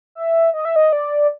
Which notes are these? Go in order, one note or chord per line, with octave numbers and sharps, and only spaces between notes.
E5
D#5
E5
D#5
D5